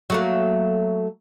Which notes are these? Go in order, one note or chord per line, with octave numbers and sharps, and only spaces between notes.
F#3 A3 A#3